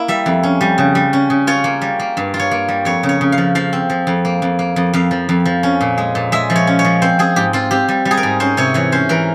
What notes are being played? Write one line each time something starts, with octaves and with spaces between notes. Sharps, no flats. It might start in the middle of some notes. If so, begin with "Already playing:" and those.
Already playing: A#3 E4
G3 E5
F2
C#4
G3
C#3
G3
C#4
C#3
F4 C#5
A#3
G3
A#3
G2
F4
C#5
A#3
G3
F2 C#5
C#3
C#5
C#3
F5
F3
F3 F5
C4
F3
F2
A#3
F2
A#3
F2
F2 F5
F3
F2
F3
C#4
A#2
G#3
A#2
G#3 E5
F3
C#5
C#4
C#5
F3
C4 C5
C4 G#4
G#2 G4
C4 F4
C4 G4
G3
G3
G#4
A#4
G#2
C#4 C5
C3 C#5
E3 C#5
C#4 C5
E3 A#4